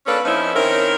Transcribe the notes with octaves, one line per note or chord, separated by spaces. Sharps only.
A#3 C#4 D4 A4 B4
F3 C4 C#4 D#4 E4
D#3 C4 C#4 E4 A#4